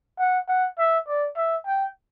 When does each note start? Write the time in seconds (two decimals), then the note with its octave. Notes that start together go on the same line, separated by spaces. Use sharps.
0.19 F#5
0.48 F#5
0.78 E5
1.07 D5
1.36 E5
1.66 G5